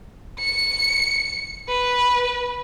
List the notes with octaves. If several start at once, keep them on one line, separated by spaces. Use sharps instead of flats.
C#7
B4